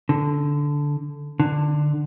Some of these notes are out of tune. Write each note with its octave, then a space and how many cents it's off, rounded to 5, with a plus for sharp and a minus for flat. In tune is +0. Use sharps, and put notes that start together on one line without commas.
D3 -10
D3 +15